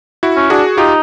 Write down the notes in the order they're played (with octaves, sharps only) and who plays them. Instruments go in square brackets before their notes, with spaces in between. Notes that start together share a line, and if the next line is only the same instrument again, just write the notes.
[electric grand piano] E4 F#4
[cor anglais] C#4
[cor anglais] D4 [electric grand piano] F#4 G#4
[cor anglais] D#4 [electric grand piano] F4 G4